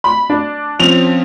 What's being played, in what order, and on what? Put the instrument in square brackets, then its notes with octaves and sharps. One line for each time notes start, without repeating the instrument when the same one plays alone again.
[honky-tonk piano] B5
D4
[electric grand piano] F3 C4 C#4 [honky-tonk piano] F7